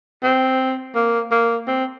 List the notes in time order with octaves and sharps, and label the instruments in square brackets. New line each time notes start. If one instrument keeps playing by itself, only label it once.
[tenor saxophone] C4
A#3
A#3
C4